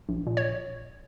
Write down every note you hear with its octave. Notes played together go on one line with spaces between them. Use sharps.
A#1
A#2
C#5